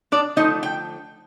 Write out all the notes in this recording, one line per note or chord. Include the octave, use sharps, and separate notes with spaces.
D4 D5
D3 F3 A3 D#4 D#5
G5